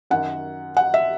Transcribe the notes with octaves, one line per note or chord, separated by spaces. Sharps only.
F#2 D#3 F#5
F#5
E5